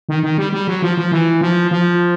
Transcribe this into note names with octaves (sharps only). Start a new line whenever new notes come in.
D#3
D#3
G3
G3
F#3
F3
F3
E3
F3
F3